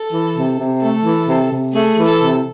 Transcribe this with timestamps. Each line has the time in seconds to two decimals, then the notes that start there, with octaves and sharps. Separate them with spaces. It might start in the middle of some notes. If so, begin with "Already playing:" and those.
Already playing: A4
0.12 E3
0.35 C3
0.59 C3
0.81 A3 A4
1.04 E3
1.27 C3
1.51 C3
1.74 A3 G#4
1.97 E3
2.05 A4
2.20 C3